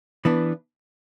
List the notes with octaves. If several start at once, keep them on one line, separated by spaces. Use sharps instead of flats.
E3 B3 D4